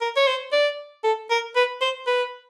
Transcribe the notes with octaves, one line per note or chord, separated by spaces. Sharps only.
A#4
C#5
C5
D5
A4
A#4
B4
C5
B4